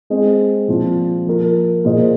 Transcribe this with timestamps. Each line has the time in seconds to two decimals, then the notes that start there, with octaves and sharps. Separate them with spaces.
0.10 G#3 C4 G#4 D#5
0.68 A#2 F3 C4 F4
1.27 F3 A#3 F4 A#4
1.84 A#2 A#3 G#4 C5 D#5